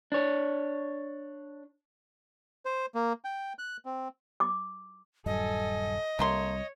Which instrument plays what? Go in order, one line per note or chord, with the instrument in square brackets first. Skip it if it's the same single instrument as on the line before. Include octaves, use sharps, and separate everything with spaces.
[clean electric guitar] D4 C#5
[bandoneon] C5
A#3
G5
F#6
C4
[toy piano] D6
[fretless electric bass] D#1 G2 F#3 [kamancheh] A4 G#5 [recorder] D#5
[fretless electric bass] C2 C3 G3 [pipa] A3 A#3 C6 [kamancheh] C#5